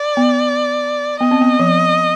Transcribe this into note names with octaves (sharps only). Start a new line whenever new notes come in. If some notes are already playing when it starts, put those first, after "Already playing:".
Already playing: D5
B3
B3 D#5
C4
B3
F3